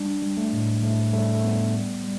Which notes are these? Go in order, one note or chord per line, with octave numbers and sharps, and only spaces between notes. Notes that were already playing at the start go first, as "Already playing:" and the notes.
Already playing: G3 D4
G3
A3
A2
A2 A3
G3 A3
A3
G3 B3
G3
G3